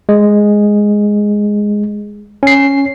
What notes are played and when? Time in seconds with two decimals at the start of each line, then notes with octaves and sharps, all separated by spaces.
0.09 G#3
2.43 C#4 C7